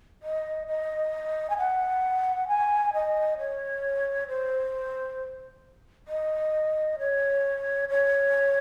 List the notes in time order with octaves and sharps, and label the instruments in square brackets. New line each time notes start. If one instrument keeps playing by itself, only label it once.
[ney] D#5
D#5
G#5
F#5
G#5
D#5
C#5
C5
D#5
C#5
C#5